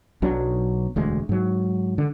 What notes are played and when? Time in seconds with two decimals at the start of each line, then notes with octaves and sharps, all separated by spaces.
0.22 B1 B2 F#3 D4
0.96 E1 D2 G#3
1.29 G#2 F#3
1.98 D3